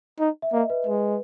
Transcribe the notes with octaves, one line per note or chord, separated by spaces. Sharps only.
D#4
E5
A#3 D#5
B4
G#3 B4